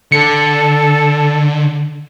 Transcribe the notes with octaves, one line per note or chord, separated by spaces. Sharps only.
D3 A4 C#7